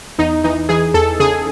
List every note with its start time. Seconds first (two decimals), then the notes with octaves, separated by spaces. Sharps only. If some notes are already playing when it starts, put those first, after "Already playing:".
0.18 E2 D#4
0.44 E3 D#4
0.69 E3 G#4
0.94 E2 A4
1.20 C#3 G#4